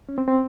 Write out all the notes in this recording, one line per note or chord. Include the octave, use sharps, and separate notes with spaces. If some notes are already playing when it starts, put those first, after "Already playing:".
C#4
C4
C4